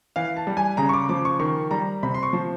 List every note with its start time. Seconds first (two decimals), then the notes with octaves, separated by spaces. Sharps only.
0.16 E3 F5
0.37 A5
0.47 G3
0.57 G#5
0.77 C#3 A#5
0.89 C#6
0.93 D6
1.09 F3 D6
1.25 C#6
1.39 D#3 C#6
1.71 G3 A#5
2.03 C3 B5
2.14 C6
2.23 C#6
2.33 F3